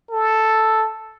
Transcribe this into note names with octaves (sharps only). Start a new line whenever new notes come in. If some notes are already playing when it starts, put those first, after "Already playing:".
A4